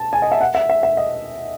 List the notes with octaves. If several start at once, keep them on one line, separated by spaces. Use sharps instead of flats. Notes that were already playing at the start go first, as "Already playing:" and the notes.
Already playing: A5
G#5
D#5
E5
F#5
E5
E5
E5
D#5